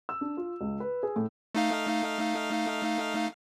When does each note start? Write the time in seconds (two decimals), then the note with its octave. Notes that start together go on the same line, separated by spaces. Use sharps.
0.09 E6
0.21 D4
0.37 F4
0.61 C#2
0.80 B4
1.03 G#4
1.16 A2
1.55 A3 D#4 F5